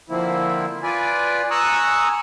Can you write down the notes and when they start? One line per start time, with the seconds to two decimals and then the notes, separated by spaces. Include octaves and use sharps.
0.10 D3 F3 A#3 C4 E4
0.83 F4 B4 D5 G#5
1.51 G#5 A#5 C#6 D#6 E6 F#6